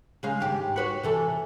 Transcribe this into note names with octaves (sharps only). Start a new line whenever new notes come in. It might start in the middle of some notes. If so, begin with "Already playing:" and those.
C#3 G#3 F5
D#2 G#2 G4
F#4 B4 C#5
C3 E3 A4